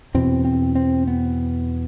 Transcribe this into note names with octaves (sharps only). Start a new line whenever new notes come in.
E2 B2 C4
C4
C4
B3